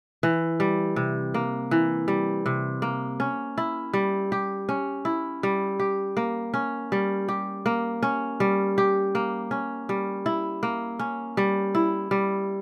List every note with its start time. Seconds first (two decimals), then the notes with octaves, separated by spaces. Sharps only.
0.23 E3
0.60 G3
0.96 C3
1.34 A#3
1.71 E3
2.08 G3
2.46 C3
2.82 A#3
3.20 C#4
3.58 E4
3.94 G3
4.32 G4
4.69 C#4
5.05 E4
5.43 G3
5.80 G4
6.17 A#3
6.54 C#4
6.92 G3
7.29 G4
7.66 A#3
8.03 C#4
8.40 G3
8.78 G4
9.15 A#3
9.51 C#4
9.89 G3
10.26 E4
10.63 A#3
10.99 C#4
11.37 G3
11.75 E4
12.11 G3